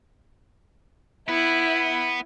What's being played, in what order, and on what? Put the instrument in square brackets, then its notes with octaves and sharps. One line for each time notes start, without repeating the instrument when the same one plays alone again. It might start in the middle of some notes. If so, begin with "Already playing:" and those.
[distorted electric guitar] B3 [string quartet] E4